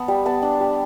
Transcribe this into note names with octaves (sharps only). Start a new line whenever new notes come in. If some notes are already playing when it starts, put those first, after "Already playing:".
Already playing: B3 A5
G3
B3 A5
D4
G3